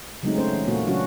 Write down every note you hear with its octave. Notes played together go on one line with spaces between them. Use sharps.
C#3 F#3 G#3 A3 C4 D#4
A3 C#4 C5
E3 C#4
A#2 A3 A#3 F#4
C#3 F#3 C#4 D4 F#4